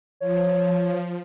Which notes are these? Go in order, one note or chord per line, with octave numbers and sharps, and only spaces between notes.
F3 C#5